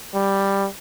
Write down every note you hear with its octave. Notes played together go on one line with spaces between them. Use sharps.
G3